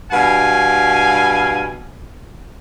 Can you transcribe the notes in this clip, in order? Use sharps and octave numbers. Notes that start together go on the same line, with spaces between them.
G2 B2 F5 G#5